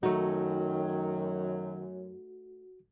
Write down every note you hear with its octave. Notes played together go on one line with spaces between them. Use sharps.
F#2 D#3 F#3 A3 D#4 F#4